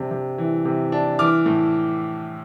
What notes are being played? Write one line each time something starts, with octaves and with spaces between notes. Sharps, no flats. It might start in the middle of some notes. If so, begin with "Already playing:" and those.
Already playing: C3 D4
C3
E3
C3
D4
E3 D6 F6
A2